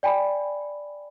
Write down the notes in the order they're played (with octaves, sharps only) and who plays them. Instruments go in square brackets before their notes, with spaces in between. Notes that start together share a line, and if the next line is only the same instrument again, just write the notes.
[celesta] D5 G5 G#5 B5